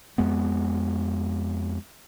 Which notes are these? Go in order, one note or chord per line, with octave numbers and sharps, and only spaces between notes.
F2 G#3 B3